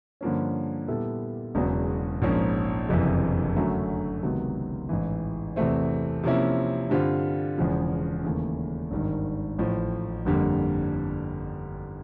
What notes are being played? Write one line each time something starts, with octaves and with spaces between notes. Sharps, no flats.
G2 D3 F3 A#3 C#4
A#2 G3 B3 E4 A4
E1 E2 C#3 F#3 B3
A#1 G#2 F3 A#3 C#4
F#1 F2 C3 E3
F#2 D3 F#3 A3 C#4
C#2 C3 D#3 F#3 B3
A1 G#2 E3
E2 C3 E3 A3 C4
C3 F3 A#3 C#4 E4
G2 D3 G3 C4 F4
E1 E2 C#3 F3
D#2 C#3 E3 A3
G#1 G2 D#3
A1 A2 F3
G1 F2 D3 G3 A#3